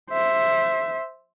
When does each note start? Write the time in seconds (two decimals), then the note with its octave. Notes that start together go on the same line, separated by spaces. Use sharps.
0.11 C5 E5